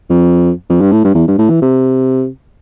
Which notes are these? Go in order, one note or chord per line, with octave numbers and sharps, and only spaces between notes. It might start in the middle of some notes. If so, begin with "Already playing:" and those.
F2
F2
G2
A2
G2
E2
G2
A2
E3
C3